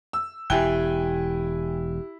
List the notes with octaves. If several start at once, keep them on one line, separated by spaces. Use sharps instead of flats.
E6
E1 E4 G4 G5 G#5 F#6 G7